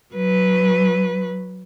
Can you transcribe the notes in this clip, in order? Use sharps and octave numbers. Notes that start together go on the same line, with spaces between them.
F#3 B4